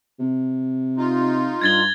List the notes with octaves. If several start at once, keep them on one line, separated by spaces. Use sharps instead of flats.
C3
D#4 F4
G2 G#6 A6 G7